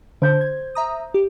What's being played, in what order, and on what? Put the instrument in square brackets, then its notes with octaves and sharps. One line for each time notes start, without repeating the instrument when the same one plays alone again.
[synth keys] D3 [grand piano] C5 G6
[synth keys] G#6
E5 A#5 D#6
G4